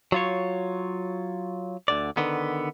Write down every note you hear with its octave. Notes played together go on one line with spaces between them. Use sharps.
F#3 F4 C#5
D2 D3 D5
D3 D#3 B3